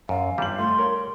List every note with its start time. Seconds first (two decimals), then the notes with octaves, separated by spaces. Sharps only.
0.09 F#2 F5
0.38 G1 G3 F#7
0.58 A3 F4 C6
0.78 A#4 C#5